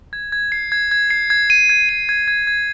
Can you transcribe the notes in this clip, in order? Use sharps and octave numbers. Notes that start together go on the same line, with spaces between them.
G#6
G#6
C7
G#6
G#6
C7
G#6
D#7
G#6
D#7
G#6
G#6
G#6